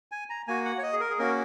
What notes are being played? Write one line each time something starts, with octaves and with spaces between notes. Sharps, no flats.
G#5
A#5
A#3 F#4 G#5
F#5
C#5
D#5
G#4
A#4
G#4
A#3 C#4 F#4 A#4